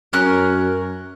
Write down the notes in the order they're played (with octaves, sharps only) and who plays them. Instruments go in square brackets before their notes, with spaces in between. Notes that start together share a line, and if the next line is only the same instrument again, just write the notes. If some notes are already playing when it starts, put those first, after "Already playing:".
[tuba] F#2 [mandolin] C#4 A#4 F#6